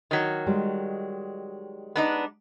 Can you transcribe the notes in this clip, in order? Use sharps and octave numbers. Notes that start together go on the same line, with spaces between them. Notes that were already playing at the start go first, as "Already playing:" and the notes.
D#3 F#3
G3 G#3
B3 D4 D#4